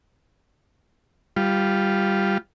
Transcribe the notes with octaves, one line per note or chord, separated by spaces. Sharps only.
G3 F4